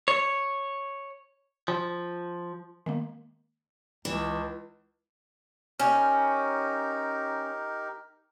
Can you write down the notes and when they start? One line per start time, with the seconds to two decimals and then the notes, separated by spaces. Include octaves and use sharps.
0.08 C#5
1.68 F3
2.86 D#3 G#3 A#3
4.05 C#2 E3
5.80 C#4 D#4 G4 A#4